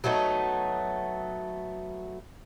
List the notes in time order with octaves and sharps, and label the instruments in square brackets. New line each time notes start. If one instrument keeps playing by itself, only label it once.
[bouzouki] F#3 A3 B3 D#4